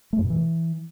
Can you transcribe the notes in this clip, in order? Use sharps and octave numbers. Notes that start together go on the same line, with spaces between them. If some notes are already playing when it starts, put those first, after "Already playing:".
A3
F#2
B2
E3